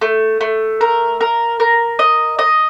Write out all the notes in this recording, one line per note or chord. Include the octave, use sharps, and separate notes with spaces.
A3
A3
A#4
A#4
A#4
D#5
D#5